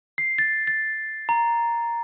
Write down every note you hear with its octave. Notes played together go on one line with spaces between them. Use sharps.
C7
A6
A6
A#5